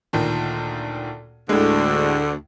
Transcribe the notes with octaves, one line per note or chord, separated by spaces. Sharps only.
D2 A#2 D#3
D2 A2 D3 G#3